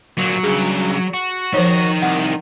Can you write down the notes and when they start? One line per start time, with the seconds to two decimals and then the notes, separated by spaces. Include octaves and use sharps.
0.18 D2 A#2 F#3
0.43 G2 C#3 G#4
1.14 F#4
1.54 F3 D#4 A#4 C5 C#5
2.02 C2 F#5